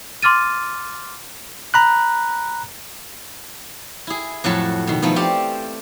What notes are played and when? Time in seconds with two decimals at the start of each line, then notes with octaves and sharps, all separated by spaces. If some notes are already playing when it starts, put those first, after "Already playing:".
0.23 C6 D6 F6 A6 D#7
1.74 A#5 B5 F#6
4.07 E4 G#4
4.44 F2 A2 F#3 F#4 A4 A5
4.87 B2 D#3
5.02 F3 A3 B3 D#4
5.16 C4 G4 C5 D5 F5